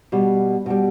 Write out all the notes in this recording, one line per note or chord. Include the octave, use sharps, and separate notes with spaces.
B2 G3
B2 G3